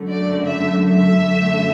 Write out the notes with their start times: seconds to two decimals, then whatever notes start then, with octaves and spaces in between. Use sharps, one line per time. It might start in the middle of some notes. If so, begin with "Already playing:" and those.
Already playing: F#2 D3 F#3 A3
0.11 D5
0.46 E5
0.84 E5
1.20 F#2 D3 F#3 A3